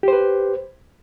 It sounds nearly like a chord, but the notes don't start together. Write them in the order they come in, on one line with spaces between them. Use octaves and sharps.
G4 C5 B4